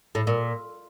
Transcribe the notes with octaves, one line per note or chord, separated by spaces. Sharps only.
A2
A#2